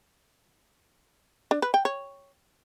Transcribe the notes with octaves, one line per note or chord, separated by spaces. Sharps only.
D4
B4
G5
C#5